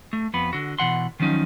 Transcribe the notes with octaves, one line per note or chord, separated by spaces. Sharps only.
A3
F2 B3 B5
D3 F#4
B2 E3 F#5 C6
D#3 F3 F#3 C#4 D#4